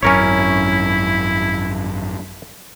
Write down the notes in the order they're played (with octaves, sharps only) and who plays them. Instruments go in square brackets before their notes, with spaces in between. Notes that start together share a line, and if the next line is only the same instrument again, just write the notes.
[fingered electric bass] G#1 F#2 [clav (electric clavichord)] C#4 A#4 C#5 [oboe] E4